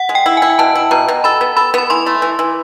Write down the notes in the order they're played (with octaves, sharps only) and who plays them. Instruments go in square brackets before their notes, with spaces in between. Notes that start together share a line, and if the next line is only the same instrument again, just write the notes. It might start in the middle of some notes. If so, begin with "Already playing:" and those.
Already playing: [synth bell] F#5
[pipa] G#3
[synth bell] G5
[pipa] E4
[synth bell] G#5
[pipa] E4
[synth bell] G#5
[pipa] B2 [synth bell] A5
[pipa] E4
[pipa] B2 [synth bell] A#5
[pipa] B2
[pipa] A4 [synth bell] B5
[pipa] B3
[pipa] A4 [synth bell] B5
[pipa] B3 [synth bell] B5
[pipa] E3 [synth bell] C6
[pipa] A3
E3
E3